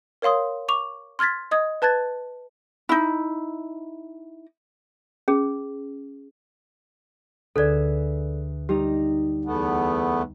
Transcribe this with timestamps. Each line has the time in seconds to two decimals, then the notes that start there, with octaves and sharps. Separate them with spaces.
0.22 A#4 C#5 F5 C6 D#6
0.68 C#6 D6 F7
1.19 C6 F6 G#6 A6 B6
1.51 D#5 D#6 G#6
1.82 B4 A5 F#6 G#6 A6
2.89 D#4 E4
5.28 C#4 G#4
7.56 D2 D3 G#4 A4 B4 D5 E5 G#6
8.69 G3 D#4 G4 A#5
9.45 E2 A3 B3